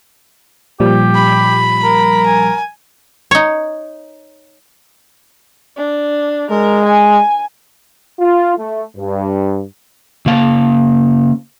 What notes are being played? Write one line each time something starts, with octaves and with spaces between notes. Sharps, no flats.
A#2 F3 G3 G4
B5
A#4
G#5
D#4 C#5
D4
G#3 A#4
G#5
F4
A3
G2
C#3 A#3 F5 A5